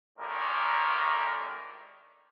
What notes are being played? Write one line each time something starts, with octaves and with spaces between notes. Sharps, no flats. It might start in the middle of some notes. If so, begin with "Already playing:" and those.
G#1 A2 D3 D#3 G3 A#4